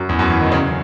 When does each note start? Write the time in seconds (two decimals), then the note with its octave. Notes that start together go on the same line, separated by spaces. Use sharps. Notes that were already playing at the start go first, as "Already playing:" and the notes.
Already playing: F#2
0.09 E2
0.19 F#2
0.30 E3
0.41 D#3
0.52 C#3